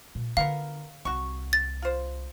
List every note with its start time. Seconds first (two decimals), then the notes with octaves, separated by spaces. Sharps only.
0.15 A#2
0.37 D3 B3 F4 A#4 F5
1.05 C2 F#4 C#6
1.53 A6
1.82 F4 C5